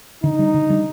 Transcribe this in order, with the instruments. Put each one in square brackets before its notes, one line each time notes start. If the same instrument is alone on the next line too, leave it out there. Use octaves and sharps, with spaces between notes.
[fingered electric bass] D3 [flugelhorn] D#4
[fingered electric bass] G3 D4
D3
G3 D4